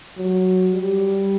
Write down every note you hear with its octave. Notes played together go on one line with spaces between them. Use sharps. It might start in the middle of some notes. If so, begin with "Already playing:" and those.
F#3
G3